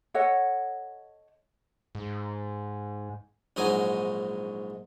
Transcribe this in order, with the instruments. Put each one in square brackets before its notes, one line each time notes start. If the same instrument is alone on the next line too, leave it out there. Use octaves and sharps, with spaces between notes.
[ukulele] A4 C#5 D#5 F#5
[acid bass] G#2
[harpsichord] A#1 G#2 F#3 D#4 G#5